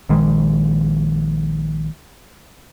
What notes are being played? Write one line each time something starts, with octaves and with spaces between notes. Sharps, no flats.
A#1 D#3 G#3